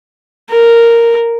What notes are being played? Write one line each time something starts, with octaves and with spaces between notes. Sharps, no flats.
A#4